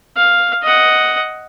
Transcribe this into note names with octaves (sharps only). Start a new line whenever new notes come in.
F5
D#5 F#5